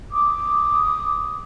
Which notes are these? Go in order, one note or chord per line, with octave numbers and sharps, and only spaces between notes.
D6 D#6